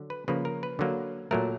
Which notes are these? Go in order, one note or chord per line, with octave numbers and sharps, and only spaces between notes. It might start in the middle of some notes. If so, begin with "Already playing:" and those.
Already playing: D3 F#3
B4
C#3 F3 A#3 B4
A#4
B4
D3 F#3 A#3
A#2 F#3 A3 A#4